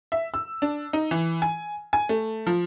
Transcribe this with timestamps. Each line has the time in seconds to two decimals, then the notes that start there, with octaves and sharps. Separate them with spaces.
0.12 E5
0.34 E6
0.62 D4
0.93 D#4
1.11 E3
1.42 G#5
1.93 G#5
2.09 A3
2.47 F3